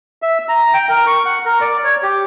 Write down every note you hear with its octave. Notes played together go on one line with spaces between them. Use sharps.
E5
A#5
G5
A#4
C#6
F#5
A#4
D5
C#5
G4